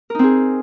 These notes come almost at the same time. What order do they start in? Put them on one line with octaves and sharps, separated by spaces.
A#4 D#4 C4 G#4